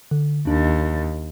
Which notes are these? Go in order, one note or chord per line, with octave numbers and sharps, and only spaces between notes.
D3
D#2 D4